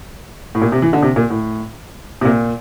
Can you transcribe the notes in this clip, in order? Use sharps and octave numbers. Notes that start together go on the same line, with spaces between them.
A2
A#2
C3
E3
D3
C3
A#2
A2
C3
A#2